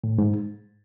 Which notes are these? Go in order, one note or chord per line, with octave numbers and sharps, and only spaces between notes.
A2
G#2